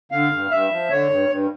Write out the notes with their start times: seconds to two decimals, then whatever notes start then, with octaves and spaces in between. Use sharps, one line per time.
0.12 D3 F5
0.31 G2
0.51 G2 E5
0.71 F3
0.90 D3 C#5
1.10 G2
1.29 G2